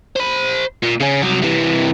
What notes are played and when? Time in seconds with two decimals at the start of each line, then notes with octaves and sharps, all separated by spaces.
0.16 C5 B5
0.83 A#2
1.01 C#3 C#4
1.22 C2 F#3
1.42 C3 E3